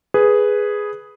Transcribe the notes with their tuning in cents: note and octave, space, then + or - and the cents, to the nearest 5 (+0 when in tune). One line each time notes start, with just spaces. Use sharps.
G#4 +0 B4 +0